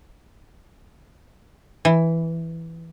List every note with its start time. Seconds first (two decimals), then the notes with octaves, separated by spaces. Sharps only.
1.85 E3